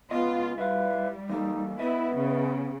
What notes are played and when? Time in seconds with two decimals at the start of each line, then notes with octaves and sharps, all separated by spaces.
0.11 C#2 B3 F4 D#5
0.58 G3 E4 B4 F5
1.29 E3 A#3 D#4 A4
1.79 B3 E4 B4 D#5 E5
2.15 C#3